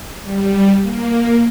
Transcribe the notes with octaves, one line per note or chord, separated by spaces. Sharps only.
G3
A#3